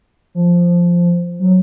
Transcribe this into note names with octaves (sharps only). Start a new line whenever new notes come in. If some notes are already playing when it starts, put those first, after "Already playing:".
F3
F#3